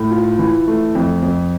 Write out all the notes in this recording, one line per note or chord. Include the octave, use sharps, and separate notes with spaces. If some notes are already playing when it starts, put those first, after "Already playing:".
Already playing: A2
F4
E3
A3
F2
F2